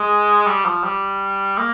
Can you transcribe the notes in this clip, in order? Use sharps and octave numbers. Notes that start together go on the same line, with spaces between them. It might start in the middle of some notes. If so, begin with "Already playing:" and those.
Already playing: G#3
G3
F3
G3
A#3